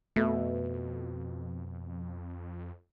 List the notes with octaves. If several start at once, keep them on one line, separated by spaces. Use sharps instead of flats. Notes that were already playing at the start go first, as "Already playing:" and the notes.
F2 B2 A3